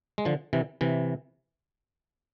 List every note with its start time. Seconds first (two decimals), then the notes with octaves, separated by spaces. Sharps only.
0.18 G#3
0.25 D3 F3
0.53 C3 E3
0.81 C3 E3